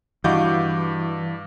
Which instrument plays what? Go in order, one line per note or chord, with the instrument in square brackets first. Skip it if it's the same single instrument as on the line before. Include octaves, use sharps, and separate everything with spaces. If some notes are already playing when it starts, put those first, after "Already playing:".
[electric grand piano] G2 D6 G6 [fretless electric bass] E3 [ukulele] F#4 D#5 F5